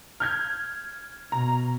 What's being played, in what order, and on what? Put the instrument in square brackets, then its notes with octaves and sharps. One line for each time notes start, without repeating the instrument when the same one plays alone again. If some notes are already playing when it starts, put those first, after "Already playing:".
[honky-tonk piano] F6 G6 G#6
[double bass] B2 [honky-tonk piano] A#5